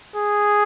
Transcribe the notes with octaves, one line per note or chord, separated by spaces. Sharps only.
G#4